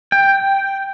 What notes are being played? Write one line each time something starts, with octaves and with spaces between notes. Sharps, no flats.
G5